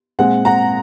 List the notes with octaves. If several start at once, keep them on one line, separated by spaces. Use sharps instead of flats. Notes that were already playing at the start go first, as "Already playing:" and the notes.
A#2 G#3 C4 F#5
F#5 A#5